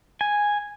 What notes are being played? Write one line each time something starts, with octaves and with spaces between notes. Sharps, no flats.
G#5